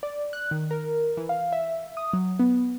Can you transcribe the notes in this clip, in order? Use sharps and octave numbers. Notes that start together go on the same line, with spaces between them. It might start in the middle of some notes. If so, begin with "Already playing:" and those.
D5
F#6
D#3
A#4
E3
F5
E5
D#6
F#3
B3